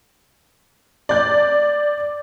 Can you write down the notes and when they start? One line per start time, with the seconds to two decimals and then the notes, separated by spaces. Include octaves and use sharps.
1.09 D5 G6